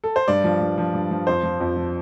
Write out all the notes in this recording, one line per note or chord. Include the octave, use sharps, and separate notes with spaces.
A4
C5
G2 D5
F3
G2
F3
G2
F3
F2 C5
F3
F2
F3